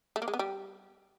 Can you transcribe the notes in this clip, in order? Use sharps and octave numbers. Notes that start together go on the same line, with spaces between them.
A3
A#3
G#3
B3
G3